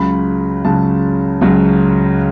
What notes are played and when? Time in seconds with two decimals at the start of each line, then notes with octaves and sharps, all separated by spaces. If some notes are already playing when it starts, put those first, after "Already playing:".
Already playing: C#2 C#3 F#3 B5
0.65 C#2 C#3 F#3 A5
1.41 C#2 C#3 F#3